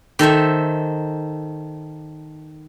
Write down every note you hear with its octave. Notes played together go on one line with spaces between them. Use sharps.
D#3 A4 C5 E5